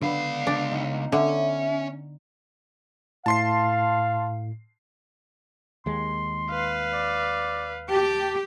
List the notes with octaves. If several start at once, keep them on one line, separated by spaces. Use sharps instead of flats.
C#2 D3 B3 F5
D4
D#4
D3 C#4 E5
A2 F5 A5 C6 C7
D#2 G#3 C6
B4 F5
D5
G4 A5